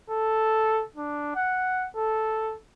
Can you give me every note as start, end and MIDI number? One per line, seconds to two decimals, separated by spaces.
0.10 0.83 69
0.96 1.32 62
1.36 1.87 78
1.97 2.55 69